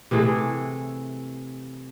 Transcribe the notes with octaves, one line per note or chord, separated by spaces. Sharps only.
C3 E3 A3 G#4